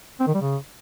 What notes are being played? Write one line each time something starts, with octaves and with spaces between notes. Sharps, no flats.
C4
D#3
G3
C#3